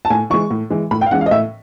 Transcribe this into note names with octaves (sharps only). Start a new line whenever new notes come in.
A5
A2 G#5
E3 G#3 C#6
A2
E3 G#3
A2 B5
G5
F5
E3 G#3 C#4 F#5
F5
D#5
A2 E5